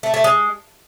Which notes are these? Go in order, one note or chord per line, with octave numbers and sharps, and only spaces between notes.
A3
A3
G#3